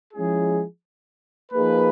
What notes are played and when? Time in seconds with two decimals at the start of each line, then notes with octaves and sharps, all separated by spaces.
0.14 F3 G#3 C#4 E4 G#4
1.52 F3 A#3 D#4 G#4 B4